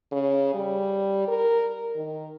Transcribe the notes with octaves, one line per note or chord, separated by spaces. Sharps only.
C#3
G3
A#4
D#3